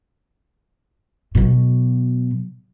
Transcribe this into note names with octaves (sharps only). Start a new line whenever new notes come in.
B2 F#3